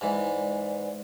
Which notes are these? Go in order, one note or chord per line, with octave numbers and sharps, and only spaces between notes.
G#2 E3 D5